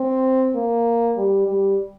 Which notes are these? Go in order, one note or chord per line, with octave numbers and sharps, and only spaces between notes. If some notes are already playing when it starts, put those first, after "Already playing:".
Already playing: C4
A#3
G3
G3